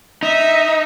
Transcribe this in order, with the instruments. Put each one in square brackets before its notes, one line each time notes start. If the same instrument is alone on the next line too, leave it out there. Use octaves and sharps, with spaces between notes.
[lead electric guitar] D#4 [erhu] E5